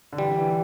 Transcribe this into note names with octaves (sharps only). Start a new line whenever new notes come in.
D3
E3 G3
E3